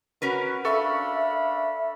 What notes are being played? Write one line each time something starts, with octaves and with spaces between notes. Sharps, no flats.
C#4 F#4 A#4 B4
D4 A4 E5 F5 B5 C#6